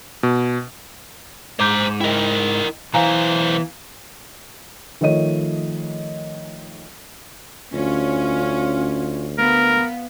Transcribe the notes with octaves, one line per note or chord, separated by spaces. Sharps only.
B2
G#2 C5 A#5 D6 G6
E4 A#4 D#5 G5
B1 E3 C5 F5 G#5 A#5
D#3 F3 A3 C#5 D#5 D#7
D2 C#4 F4
B3 A#4 F5